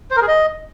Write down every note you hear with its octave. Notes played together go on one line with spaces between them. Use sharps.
C5
A#4
G#4
D#5